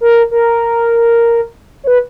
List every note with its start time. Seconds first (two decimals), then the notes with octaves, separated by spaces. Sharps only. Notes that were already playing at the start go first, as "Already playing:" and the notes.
0.01 A#4
0.31 A#4
1.84 C#5
1.87 B4